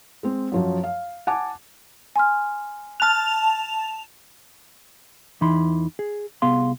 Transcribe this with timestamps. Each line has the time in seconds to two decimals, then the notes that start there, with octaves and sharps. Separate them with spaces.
0.23 G#3 C4
0.52 F#2 F3 F#3
0.84 F5
1.27 F#5 G#5 A5 D6
2.16 G#5 C6 F6
3.00 A5 F6 F#6 F7
5.41 E2 E3 D#4 B5 C6
5.99 G#4
6.42 C2 B3 G#4 F5 C6